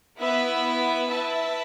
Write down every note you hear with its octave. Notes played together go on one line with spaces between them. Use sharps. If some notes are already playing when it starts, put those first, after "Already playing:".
B3 E4 B4 E5
E4 B4 E5 A5